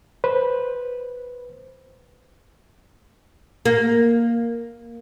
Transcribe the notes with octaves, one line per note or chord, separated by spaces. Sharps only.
B4 C5
A#3